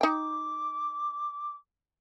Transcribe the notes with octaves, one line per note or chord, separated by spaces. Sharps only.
D#4 G5 D6